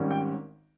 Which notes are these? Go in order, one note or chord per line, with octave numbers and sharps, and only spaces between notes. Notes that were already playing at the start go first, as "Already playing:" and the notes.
Already playing: G#1 G#2 D#3 G3 C#4
G5